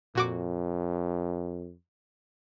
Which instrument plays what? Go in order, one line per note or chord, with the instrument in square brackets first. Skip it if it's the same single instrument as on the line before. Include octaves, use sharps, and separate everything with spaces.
[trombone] F2 [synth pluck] A#2 F#4 D6